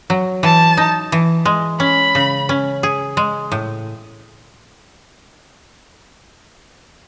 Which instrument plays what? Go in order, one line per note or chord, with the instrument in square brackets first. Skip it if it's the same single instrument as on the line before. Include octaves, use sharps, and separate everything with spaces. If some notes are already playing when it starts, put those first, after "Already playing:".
[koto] F#3
[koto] E3 [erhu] A5
[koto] D#4
E3
G#3
[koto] C#4 [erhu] B5
[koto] C#3
C#4
G#4
G#3
A2